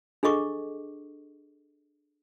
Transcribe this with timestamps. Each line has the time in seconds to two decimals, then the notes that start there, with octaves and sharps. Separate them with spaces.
0.23 D4 G#4 A4 D#5 C#6 D6